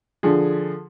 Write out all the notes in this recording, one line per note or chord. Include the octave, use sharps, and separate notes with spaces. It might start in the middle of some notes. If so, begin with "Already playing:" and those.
D3 F3 G#4